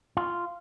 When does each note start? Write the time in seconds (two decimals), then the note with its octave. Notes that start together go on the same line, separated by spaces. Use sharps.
0.17 F4